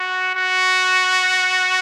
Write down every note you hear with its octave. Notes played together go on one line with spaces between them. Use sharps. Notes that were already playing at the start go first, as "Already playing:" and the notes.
Already playing: F#4
F#4